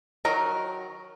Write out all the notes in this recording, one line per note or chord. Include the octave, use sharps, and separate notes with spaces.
D#3 F#3 A#4 A#5